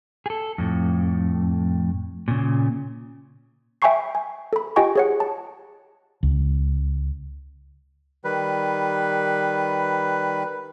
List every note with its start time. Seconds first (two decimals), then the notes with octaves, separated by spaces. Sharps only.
0.26 G#4 A4
0.58 F2 A2
2.28 A#2 C#3
3.82 E5 G5 G#5 B5 C#6 C7
4.15 G#5
4.53 A4 B5
4.76 F4 G4 D#5 G5 G#5 C#6
4.95 G#4 C#5 F#5
5.20 A5
6.23 C#2
8.24 D#3 G3 B4